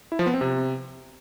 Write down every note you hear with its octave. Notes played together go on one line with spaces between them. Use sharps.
E4
F3
B3
C4
C3